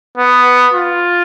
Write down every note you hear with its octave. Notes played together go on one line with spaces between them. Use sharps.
B3
F4